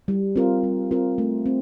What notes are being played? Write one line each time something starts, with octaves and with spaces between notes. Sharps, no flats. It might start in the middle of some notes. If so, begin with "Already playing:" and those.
G3
C4 F4 A#4
G3
C4 F4 A#4
A3
C4